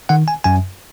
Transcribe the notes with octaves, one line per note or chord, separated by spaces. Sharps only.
D#3 F#5
G#5
F#2 G#5